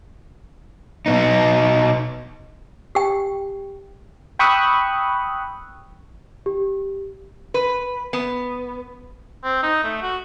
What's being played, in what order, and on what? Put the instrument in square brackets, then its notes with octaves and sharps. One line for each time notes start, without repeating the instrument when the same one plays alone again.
[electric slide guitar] B2 B3 D#4
[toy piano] G4 G5
[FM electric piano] G5 B5 C#6 D#6 E6 F#6
[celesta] G4
[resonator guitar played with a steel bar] B4
B3
[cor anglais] C4
D#4
A3
F#4